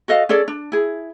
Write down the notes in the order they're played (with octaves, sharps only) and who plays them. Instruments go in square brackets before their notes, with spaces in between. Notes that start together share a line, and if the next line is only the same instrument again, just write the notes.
[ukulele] F#4 A4 D#5 F5
C#4 G#4 A4 D5
D4
E4 G#4